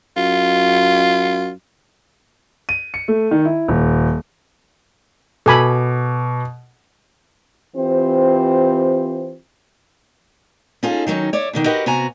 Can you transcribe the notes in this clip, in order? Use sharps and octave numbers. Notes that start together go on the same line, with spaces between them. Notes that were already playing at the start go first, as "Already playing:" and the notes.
F#2 F4
D#7
C#7
A3
D#3
E4
D#1
B2 A4 G#5 B5 D6
E3 C4 F4 G4 C5
C#4 D#4 F4 G#4 A4
D#3 F#3 A#3 C#4 D#4
C#5 D5 E5
B2 D3 D#3
F#4 G4 A#4 B4 D#5 F#5
C3 B3 F#4 G#5 A#5